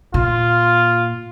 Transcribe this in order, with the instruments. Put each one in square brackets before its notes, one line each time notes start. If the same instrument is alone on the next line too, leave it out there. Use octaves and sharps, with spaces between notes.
[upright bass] A#2 [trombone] F4